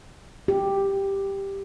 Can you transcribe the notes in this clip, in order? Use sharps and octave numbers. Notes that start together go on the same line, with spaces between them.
G4